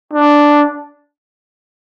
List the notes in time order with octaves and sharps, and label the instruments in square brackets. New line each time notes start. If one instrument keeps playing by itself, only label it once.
[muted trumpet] D4